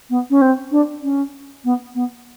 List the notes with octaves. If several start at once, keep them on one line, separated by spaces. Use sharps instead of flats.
B3
C#4
C4
D4
C#4
B3
B3